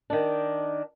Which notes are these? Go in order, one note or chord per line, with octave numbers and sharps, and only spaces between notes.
D#3 D4